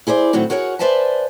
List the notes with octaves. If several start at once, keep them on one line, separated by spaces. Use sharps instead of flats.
E4 G#4 C5 D5
A2 D#3 F#3 C4 F#4
F#4 G#4 A#4 C#5 F#5
B4 C5 D5 E5 G#5 A5